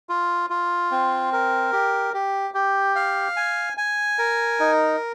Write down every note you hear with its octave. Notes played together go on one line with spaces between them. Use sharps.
F4
F4
C4
A#4
G4
G4
G4
F5
G#5
G#5
A#4
D#4